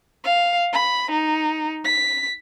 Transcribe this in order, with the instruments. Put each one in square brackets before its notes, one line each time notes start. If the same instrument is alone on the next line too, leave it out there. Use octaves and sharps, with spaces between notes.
[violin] F5
B5
D#4
B6